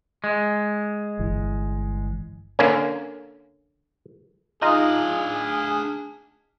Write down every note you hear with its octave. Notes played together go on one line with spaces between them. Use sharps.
G#3
G1 E3
D3 A#3 C#4
D4 D#4 F4 G#4 D#5 F5